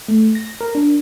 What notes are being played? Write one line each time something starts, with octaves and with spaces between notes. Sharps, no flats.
A3
A#6
A#4
D4